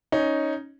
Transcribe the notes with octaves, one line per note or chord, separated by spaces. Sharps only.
C#4 D#4